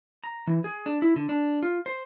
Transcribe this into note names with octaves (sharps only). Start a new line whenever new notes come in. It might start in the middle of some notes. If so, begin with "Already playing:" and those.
A#5
E3
G#4
D4
E4
D3
D4
F4
C5